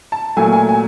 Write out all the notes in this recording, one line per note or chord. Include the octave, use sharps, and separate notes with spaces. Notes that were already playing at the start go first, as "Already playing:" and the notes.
A5
A#2 F#3 A3 G#5
G#5
G#5